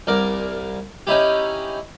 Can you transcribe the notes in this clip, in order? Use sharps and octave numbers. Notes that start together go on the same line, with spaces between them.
C2 A#4 D5
C#4 D#4 E4 G4